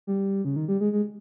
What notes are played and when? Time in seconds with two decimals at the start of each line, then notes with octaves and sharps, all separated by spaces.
0.07 G3
0.45 C#3
0.56 D#3
0.68 G3
0.81 G#3
0.93 G#3